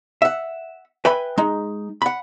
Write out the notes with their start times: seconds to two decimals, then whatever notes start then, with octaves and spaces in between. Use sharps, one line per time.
0.22 E5 F#5
1.05 B4 E5 G5 G#5 B5
1.38 G#3 D#4
2.02 F#5 B5